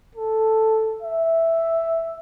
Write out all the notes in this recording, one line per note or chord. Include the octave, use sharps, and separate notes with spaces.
A4
E5